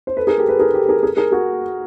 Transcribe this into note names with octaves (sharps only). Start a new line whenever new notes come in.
C5
A4 B4
G#4 A#4
G4 A4
A4 B4
G#4 A#4
G4 A4
G#4 A#4
G#4 A#4
G#4 A#4
F#4 G#4